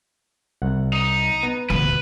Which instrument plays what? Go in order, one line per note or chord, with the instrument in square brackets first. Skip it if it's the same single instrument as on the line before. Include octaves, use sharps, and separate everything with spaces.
[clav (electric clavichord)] C2 F#5
[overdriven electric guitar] D#4
[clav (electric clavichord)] B3
[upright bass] D2 A#2 [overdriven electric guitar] B4